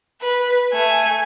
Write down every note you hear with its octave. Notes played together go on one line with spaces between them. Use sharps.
B4
A3 G#5